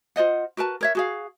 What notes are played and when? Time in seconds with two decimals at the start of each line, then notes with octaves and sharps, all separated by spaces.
0.16 F4 C5 D#5 F#5
0.57 F#4 A#4 B4 A5
0.81 A#4 C#5 E5
0.95 F#4 G#4 F5